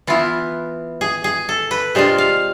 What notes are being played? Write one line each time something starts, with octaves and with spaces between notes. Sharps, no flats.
E3 B3 E4 F4
G#4
G#4
A4
B4
C3 G#3 D4 F4 C5
F5